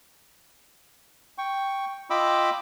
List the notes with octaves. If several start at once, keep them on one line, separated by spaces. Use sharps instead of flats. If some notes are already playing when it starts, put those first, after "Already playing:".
G5 C#6
F4 D#5 G5 B5 D6 E6